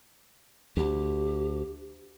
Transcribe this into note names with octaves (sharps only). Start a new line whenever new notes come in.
D2 G4